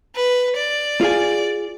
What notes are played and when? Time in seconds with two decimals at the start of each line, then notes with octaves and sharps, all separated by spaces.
0.15 B4
0.56 D5
1.01 F4 G#4 G#5